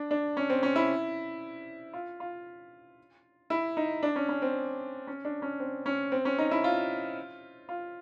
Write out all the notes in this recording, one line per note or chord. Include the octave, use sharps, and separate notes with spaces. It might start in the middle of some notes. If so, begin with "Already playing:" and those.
Already playing: D4
D4
C#4
C4
C#4
E4
F4
F4
E4
D#4
D4
C#4
C#4
C4
C#4
D4
C#4
C4
C#4
C4
C#4
D#4
E4
F4
F4